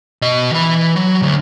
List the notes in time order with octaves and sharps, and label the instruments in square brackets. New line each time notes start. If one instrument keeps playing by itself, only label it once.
[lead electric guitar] B2 D#5
E3 B5
F#3
D2